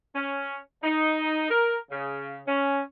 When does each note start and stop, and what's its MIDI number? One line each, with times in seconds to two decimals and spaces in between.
0.15 0.57 61
0.83 1.46 63
1.50 1.78 70
1.91 2.39 49
2.47 2.81 61